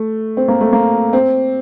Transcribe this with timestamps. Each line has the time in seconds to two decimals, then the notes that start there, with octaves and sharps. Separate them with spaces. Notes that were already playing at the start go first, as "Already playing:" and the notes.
Already playing: A3
0.37 C4
0.48 A#3
0.61 A3
0.73 A#3
1.13 C4